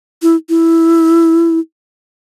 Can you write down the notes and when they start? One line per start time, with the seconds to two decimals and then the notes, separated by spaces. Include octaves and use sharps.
0.22 E4
0.49 E4